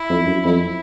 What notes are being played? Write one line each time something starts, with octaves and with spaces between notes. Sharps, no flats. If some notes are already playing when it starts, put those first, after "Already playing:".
Already playing: E4
F2
F#2
F2 E4